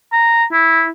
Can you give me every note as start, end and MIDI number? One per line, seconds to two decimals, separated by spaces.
0.12 0.44 82
0.52 0.88 64